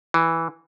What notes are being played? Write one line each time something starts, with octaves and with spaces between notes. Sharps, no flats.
E3